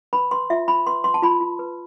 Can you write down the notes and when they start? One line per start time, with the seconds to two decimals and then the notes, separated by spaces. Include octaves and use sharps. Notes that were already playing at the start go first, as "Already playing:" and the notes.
0.13 B4 B5
0.31 B4 C6
0.50 F4 E5
0.68 F4 B5
0.87 B4 C6
1.04 B4 C6
1.14 A5
1.23 F4 B5
1.41 F4
1.59 B4